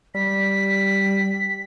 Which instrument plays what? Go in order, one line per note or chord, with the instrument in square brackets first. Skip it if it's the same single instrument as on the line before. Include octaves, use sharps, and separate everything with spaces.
[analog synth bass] G3 [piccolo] B6